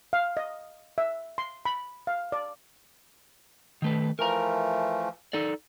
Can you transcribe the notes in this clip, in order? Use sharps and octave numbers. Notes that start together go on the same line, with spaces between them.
F5
D#5
E5
C6
B5
F5
D5
D#3 A3 B4
E3 F3 A3 A#4 A#5
D#4 A4 D5